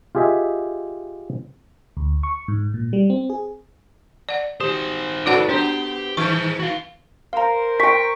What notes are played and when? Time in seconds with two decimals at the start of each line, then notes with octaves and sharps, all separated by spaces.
0.15 F4 G4 G#4 D#5 E5
1.97 D2
2.23 C#6
2.48 G#2
2.74 A#2
2.93 G3
3.10 C4
3.30 G#4
4.29 D5 F#5
4.60 D#3 G4 C5
5.26 G#2 F#4 A4 B4 D5 F#5
5.49 B3 D4 G4 C5
6.17 D#3 G#4 C5 C#6
6.60 F#4 F5
7.33 A#4 C5 F5 A#5
7.80 G5 C#6 B6